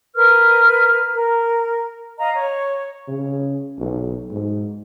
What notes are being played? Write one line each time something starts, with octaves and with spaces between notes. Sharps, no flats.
A#4 B4 F6
A#4
D#5 F5 A#5
C#5
C#3
B1
G#2